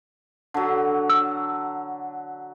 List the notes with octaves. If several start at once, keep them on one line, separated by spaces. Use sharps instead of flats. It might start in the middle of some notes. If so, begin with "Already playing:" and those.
D3 F#3
E6